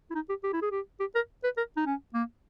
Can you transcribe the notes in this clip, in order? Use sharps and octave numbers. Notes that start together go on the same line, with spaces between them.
E4
D#4
G4
G4
E4
G#4
G4
G4
A#4
B4
A#4
D#4
C#4
A#3